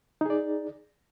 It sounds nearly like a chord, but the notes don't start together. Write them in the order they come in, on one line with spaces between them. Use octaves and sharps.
D#4 G#4 D5